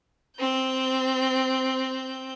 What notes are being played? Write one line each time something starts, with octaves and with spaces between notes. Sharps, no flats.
C4 G6